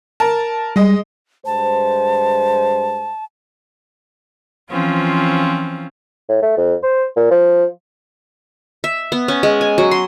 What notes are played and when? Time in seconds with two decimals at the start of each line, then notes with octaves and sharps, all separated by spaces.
0.20 A#4 A5
0.76 G3 G#3 D#5
1.46 G2 G#3 C5 A5
4.70 E3 F3 C4 C#4 F4
6.29 A2
6.42 A3
6.57 F2
6.83 C5
7.16 A#2
7.31 F3
8.84 E5
9.12 B3
9.28 C#4
9.43 G#3
9.61 G#5
9.78 F#3
9.91 C6